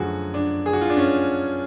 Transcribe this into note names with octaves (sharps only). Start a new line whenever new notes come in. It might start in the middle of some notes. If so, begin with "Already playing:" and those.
Already playing: F#2 D3 F3 A3 F#4 G#4
D4
G#4
F#4
F4
D4
C#4